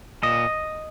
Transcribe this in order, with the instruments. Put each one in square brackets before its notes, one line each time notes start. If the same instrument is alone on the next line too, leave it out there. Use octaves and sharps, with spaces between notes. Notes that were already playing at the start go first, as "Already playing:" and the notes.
[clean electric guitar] A#2 D#5